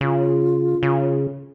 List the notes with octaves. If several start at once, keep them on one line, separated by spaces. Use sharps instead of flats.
C#3 F4
C#3